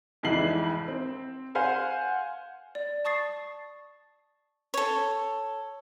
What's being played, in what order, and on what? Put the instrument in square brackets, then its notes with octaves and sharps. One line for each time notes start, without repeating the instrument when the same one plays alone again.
[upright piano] F1 F2 G#2 E3 C7 F#7
C4
C5 F5 F#5 G#5
[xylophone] D5
A5 C#6 D#6 A6 C7
[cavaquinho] A4 C#5